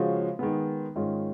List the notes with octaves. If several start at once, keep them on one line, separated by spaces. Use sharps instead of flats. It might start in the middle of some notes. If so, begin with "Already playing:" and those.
Already playing: C#3 F3 G#3 C#4 F#4
D#3 G#3 B3
G#2 D#3 G#3 C#4 F4